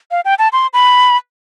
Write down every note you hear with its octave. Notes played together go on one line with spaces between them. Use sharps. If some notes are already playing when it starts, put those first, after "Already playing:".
F5
G5
A5
C6
B5